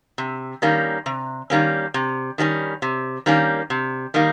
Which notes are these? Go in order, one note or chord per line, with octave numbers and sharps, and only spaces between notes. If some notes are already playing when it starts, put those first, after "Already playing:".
C3
D#3 G3 A#3 C#4
C3
D#3 G3 A#3 C#4
C3
D#3 G3 A#3 C#4
C3
D#3 G3 A#3 C#4
C3
D#3 G3 A#3